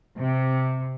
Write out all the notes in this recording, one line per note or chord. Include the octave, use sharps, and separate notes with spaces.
C3